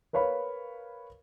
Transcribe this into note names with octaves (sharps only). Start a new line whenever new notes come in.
A#4 B4 C#5 F5 B5